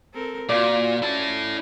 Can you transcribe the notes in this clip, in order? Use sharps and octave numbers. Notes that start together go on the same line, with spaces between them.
C4 A4 A#4
A#2 F4 F#4 D5
C#4 E4 A5